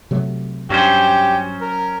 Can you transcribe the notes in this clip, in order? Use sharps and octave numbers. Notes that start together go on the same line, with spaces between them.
C3 F#3 A3
G2 F#3 C#4 G4 C5
A#4